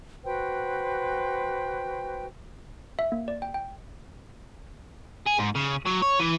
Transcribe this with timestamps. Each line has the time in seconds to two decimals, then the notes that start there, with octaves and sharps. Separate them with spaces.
0.24 F#4 B4 C5 G5
2.99 E5
3.12 A#3
3.28 D5
3.42 G5
3.54 G5
5.26 G#4
5.39 G#2
5.55 C#3
5.85 F#3
6.02 C#5
6.19 E3